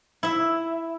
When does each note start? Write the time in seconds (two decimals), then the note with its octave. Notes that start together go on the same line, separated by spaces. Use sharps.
0.23 E4 E5